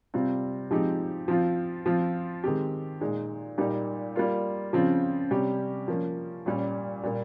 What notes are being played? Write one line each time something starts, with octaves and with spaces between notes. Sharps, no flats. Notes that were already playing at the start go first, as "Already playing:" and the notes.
C3 G3 C4 F4
F3 G#3 C4 D#4 G4
F3 C4 F4
F3 C4 F4
D#3 G#3 C4 G4
A#2 G#3 D#4
A#2 G3 A#3 D#4 G4
G3 A#3 F4
C#3 F3 C4 F4
C3 G3 C#4 G4
F3 A#3 C#4
A#2 G3 C#4
A#2 G3 A#3